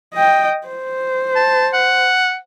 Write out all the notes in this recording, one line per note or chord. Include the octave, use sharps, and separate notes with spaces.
D#5 G5
C5
A5
F#5